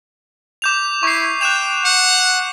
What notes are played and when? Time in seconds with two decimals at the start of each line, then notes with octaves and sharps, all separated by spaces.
0.62 D6 G6 F7
1.03 E4 C#6 C7
1.41 G5 F#6 E7 F7
1.85 F#5